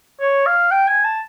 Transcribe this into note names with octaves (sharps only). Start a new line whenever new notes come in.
C#5
F5
G5
G#5
A5